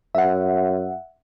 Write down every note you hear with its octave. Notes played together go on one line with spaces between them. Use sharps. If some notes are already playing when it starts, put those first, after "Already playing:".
F#2 E5 F#5